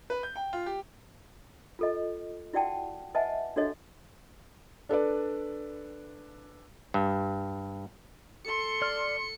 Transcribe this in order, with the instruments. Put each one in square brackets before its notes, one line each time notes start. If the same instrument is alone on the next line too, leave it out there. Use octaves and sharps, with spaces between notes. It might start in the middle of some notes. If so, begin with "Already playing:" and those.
[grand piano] B4
G6
G5
F4
G4
[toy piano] F4 A4 D#5
E4 F#4 D5 F#5 G5 A5
B4 D#5 E5 F#5 G#5 A5
D4 F#4 A4 C#5 D#5
[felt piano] D4 A4 B4 D5
[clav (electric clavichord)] G2
[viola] A4 C6 [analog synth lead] C#7
[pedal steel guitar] D5 F6